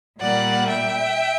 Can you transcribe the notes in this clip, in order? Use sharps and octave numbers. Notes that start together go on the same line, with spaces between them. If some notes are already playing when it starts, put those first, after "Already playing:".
A#2 G3 A#3 D5 F#5
E5 G5